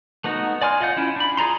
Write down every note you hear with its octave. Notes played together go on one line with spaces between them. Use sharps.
A3 B3 D#4 F#4
D5 G#5 C6 F6
F4 D#5 F5 F#5 G6
C#4 E4 F4
D4 B5
F4 G#4 D5 A#5 C6